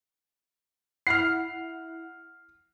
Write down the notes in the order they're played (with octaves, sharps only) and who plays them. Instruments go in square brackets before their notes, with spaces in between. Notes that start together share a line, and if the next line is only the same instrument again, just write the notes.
[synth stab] E4 F#5 [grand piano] F6 C7